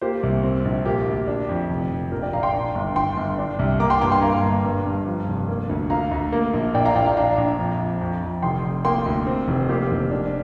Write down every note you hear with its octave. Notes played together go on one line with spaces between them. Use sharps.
A#3 G4 C5
C2
C4
A#1
A#3 G4
D2
D4
F2
F1
F1
A#1 A#4
D5 G5
A#1 F5 A#5
G5 C6
D4
G1
G1 G5 C6
G1
D4
C2
A#3 A#5 D6
G5 C6
G2 A#5 D6
G5 C6
A#3 F5 A#5
G1
G2
G2
F3
F1
A#3
D2
D2 F5 A#5
D2
A#3
A#1
A#1 D5 G5
F5 A#5
A#1 D5 G5
F5 A#5
D4 F5 A#5
A#1
F2
F2
F2
F2
F1 G5 C6
F1
A#3 G5 C6
D2
C4
F1
A#3 G4 C5
F1
D4